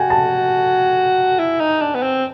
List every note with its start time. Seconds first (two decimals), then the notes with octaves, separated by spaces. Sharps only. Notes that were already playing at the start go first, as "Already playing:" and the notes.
Already playing: F#4 G5 G#5
0.10 A5
1.39 E4
1.60 D#4
1.81 D4
1.95 B3
2.03 C4